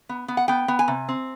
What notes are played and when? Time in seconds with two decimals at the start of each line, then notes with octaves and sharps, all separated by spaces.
0.09 B3
0.28 B3
0.37 F#5
0.48 B3 G5
0.68 B3
0.79 G#5
0.88 C3
1.08 C4